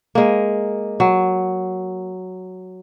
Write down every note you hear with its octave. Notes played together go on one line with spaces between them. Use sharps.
G#3 A#3
F#3